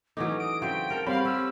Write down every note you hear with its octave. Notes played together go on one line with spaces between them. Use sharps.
E3 F#3 A3 C#4 D#4 D6
D#6 D7
C#3 F#3 C4 G5
A4 A#4
G3 C4 C#5 F5 F#5 B5
C#4 E6